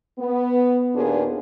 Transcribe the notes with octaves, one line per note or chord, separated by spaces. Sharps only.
B3
D#2 A#2 B3 D4 G#4